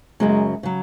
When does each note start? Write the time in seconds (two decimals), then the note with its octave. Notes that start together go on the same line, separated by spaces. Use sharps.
0.20 F#2 C#3 F#3 G#3
0.63 C#3 F#3